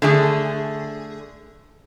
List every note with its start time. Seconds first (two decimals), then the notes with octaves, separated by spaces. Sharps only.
0.02 D3 A3 G#4